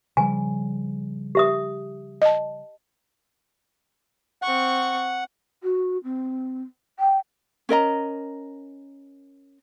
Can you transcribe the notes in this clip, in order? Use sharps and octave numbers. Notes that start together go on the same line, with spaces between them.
C#3 F3 G3 G#5
G4 E5 D#6
D#5 A5
C4 F#5 C#6
F#4
C4
G5
C#4 A#4 D#5 A#5